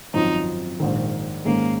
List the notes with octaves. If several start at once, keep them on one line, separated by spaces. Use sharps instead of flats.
G#1 F#2 F3 C4 D#4 F4
A#1 G#2 D#3
G#2 D#3 G#3 A#3 C#4